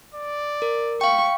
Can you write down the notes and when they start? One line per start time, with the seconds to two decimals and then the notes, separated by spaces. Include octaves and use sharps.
0.14 D5
0.62 A#4
1.01 F5 G5 C#6